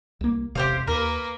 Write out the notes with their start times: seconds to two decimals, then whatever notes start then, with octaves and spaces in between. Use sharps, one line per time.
0.21 C2 A#3
0.55 E1 A1 C3 G4 C5 F5
0.87 D#2 A#3 A#4 B4